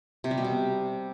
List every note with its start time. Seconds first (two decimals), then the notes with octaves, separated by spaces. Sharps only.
0.24 C3
0.31 G3
0.38 B2
0.44 C3